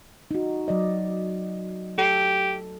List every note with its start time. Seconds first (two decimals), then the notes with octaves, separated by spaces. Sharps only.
0.31 D#4 F#4
0.68 F#3 D5 D#5
1.98 G4 A4